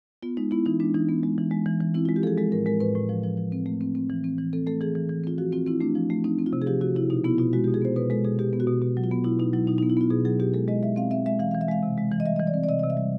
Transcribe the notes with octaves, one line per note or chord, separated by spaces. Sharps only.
B3 F4
G#3 D#4
B3 E4
E3 D#4
G#3 D4
E3 D#4
B3
G#3
E3
G#3
E3
E3
C4 E4
F4
G#3
G4
F3 G#4 A4
G#3 A4
A2 A#4
G#3 A#4
A2 B4
A2
F3
F3
F3
C4
A3
C4
C4
E3
C4
E3
C4 A4
A3 A4
E3 G#4
E3
E3
C4 F4
F3 F#4
C4 F4
C4 E4
A3 D4
F3
A3
C4 D#4
C4
F4
C3
G#4
F3 G4
C3 F#4
C3 E4
B2 D#4
B3 E4
B2 F4
G#3 F#4
G4
B2
G#4
B3 C5
B2 B4
G#3 A4
B2 G#4
B2 G4
B3
F#4
B2
B2
F#3
F4
B3
B2 E4
B2 D#4
F#3 E4
B2 D#4
D#4
B3
E4
B3 F4
B2 G#4
F#3 G#4
B2 G4
G#3 A4
G#3 D#5
G#3 E5
C4 F5
C4 E5
G#3 E5
E3 F5
F5
E3
E5
G#3 F5
C3
G#3
E3
D#5
G3 E5
D#5
E3
D5
C4
D5
C3 D#5
C3 D#5
E5
G3